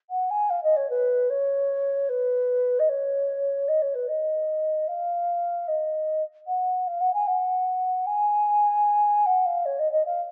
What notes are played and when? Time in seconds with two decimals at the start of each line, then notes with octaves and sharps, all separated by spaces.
0.10 F#5
0.30 G#5
0.50 F5
0.63 D#5
0.76 C#5
0.90 B4
1.30 C#5
2.09 B4
2.79 D#5
2.89 C#5
3.68 D#5
3.82 C#5
3.94 B4
4.08 D#5
4.88 F5
5.68 D#5
6.47 F#5
6.87 F5
7.00 F#5
7.13 G#5
7.27 F#5
8.06 G#5
9.26 F#5
9.45 F5
9.65 C#5
9.79 D#5
9.92 D#5
10.06 F5